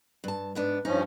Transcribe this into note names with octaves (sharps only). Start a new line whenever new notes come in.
G2 A5
G#2 B3 D4
G2 F3 C#4 D#4